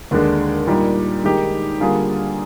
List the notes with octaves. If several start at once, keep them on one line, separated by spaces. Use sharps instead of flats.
D#2 D3 G#3 D4
A#2 G3 A#3 D#4 G4
D#3 G#3 D#4 G4
D3 G3 A#3 F4 G#4